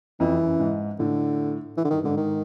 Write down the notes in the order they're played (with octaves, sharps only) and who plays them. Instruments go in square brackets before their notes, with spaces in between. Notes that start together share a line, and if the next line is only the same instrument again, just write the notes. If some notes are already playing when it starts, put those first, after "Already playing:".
[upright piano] F2 [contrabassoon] E3
[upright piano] F#2
G#2
[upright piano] A2 [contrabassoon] D3
[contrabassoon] E3
D3
[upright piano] G2 [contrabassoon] D#3
[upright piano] G#2 [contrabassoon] D3
[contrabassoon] D#3